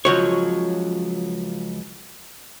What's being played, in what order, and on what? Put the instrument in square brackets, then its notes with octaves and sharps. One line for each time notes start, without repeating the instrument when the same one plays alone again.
[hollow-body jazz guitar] C#2 F3 F#3 C#5